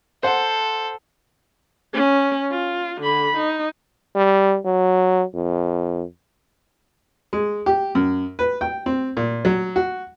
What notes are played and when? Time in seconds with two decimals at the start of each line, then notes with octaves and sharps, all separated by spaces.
0.23 A4 C5 F#5
1.94 C#4
2.51 F4
3.01 D3 B5
3.37 D#4
4.16 G3
4.65 F#3
5.34 F2
7.33 G#3
7.66 G4
7.95 F#2
8.39 B4
8.61 G5
8.86 C4
9.17 A#2
9.45 F#3
9.76 F#4